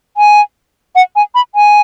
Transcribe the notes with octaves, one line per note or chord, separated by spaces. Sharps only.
G#5
F#5
G#5
B5
G#5